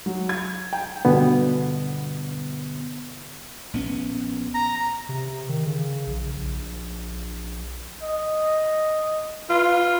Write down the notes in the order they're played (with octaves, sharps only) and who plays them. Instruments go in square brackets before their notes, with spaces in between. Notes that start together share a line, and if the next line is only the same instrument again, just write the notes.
[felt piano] F#3
G#6
G5
[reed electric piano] G2 B2 D3 B3
[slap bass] A#1 B3 C#4
[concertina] A#5
[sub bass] C3
D#3
C#3
A#1
A#1
A#1
[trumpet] D#5
[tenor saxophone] F4 [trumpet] B4